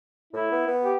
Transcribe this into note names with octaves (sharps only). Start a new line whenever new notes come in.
A2 E4
B3
B3
G4